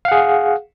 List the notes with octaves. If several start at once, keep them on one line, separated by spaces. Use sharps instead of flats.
G#4 F5 F#5